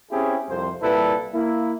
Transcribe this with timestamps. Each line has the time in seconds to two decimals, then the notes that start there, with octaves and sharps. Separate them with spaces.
0.11 C4 C#4 E4 G4 G#4
0.49 C2 F2 C3 C5
0.82 C2 A#2 G3 E4 A4 B4
1.33 A#3 E4